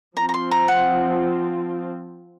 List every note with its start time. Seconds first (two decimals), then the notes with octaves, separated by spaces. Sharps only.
0.17 F3 C4 F4 A#5
0.29 A#5
0.34 C6
0.51 A#5
0.68 F#5